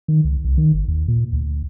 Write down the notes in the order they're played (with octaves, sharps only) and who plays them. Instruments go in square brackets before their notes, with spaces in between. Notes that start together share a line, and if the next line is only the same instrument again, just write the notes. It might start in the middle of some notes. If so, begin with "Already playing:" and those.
[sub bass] D#3
C#2
C2
D#3
G1
D#2
A#2
D2